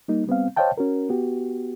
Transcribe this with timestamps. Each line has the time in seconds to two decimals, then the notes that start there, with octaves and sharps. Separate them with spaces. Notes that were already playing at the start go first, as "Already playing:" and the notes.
0.08 G3 A#3 D#4
0.27 G3 B3 C4 F5
0.57 C5 C#5 D#5 F5 G5 A5
0.78 C#4 F#4 A#4
1.10 B3 F#4 G4